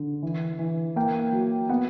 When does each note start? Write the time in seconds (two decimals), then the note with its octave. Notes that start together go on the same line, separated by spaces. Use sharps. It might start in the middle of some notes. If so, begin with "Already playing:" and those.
Already playing: D3
0.23 E3
0.59 E3
0.96 A#3 G5
1.33 F#3
1.69 B3 F#5